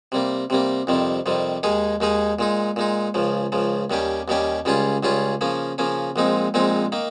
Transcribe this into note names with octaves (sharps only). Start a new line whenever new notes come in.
C3 G3 A#3
C3 G3 A#3
F2 C3 D#3 G3
F2 C3 D#3 G3
D#2 D#3 G#3 D#4 G#4
D#2 D#3 G#3 D#4 G#4
A#2 G#3 D#4
A#2 G#3 D#4
C#2 C#3 F3
C#2 C#3 F3
D#2 D#3 G3 C#4 G4
D#2 D#3 G3 C#4 G4
C#2 C#3 G3 C#4 F4
C#2 C#3 G3 C#4 F4
C#3 F3 A#3 C#4
C#3 F3 A#3 C#4
A#1 A#2 G#3 C4 D#4
A#1 A#2 G#3 C4 D#4
D#3 A#3